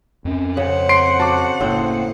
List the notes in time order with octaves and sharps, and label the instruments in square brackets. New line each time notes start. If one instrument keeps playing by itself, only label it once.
[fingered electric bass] F2 C#4
[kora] C#3 [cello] C5 F#5
[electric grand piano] C6 C7 D7
[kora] F#4 [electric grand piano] A5 D6
[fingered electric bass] F#1 A#3 [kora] A2 C4